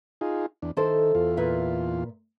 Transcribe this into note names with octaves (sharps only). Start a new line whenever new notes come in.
D#4 F4 G#4
E2 D4
D#3 E4 A4 C5
E2 F4
A#2 B4 E5